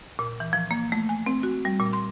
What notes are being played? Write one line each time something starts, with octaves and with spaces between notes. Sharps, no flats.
A#2
E3
F3
A#3
A3
G#5
C4
F#4
G3
A#2
C6